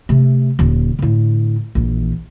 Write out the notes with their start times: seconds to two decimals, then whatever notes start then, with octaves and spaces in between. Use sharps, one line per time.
0.09 C3 A3
0.59 D#1 D3
0.99 A2 D3
1.75 A#1 E3